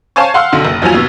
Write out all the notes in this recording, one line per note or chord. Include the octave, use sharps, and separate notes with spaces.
C5 C#5 F5 G#5 A5 C#6
F5 F#5 C6 E6 F6
B1 D3 F#4
F#1
D#2 F3 F#3 F4 G#5 F7
D#2 B2 E6